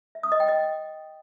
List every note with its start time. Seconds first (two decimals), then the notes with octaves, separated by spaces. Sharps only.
0.15 E5
0.23 D#6
0.32 D#5
0.40 G5
0.48 D#5